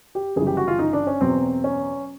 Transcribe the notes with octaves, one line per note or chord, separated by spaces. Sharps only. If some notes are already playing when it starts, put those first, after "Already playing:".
G4
G1 F#2 C#3 E3 G#4
G4
F#4
F4
D#4
D4
C#4
E2 B2 F#3 C4
C#4